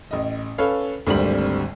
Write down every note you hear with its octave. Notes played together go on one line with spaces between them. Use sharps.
A1 D#5
C#4 A4 B4 C#5 F5
G#1 D2 D3 G3 C4 F#7